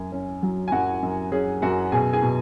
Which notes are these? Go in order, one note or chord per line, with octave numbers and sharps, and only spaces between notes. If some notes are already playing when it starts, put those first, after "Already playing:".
Already playing: F#2 G#5
C#4
F#3
G#5
F#2 F#4 F#5
F#2
C#4 G#4
F#2 F#4 F#5
B2 G#4 G#5
G#4 G#5
B2